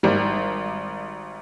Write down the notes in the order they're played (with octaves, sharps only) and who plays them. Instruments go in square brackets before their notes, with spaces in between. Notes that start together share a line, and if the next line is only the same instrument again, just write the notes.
[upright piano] G#1 G3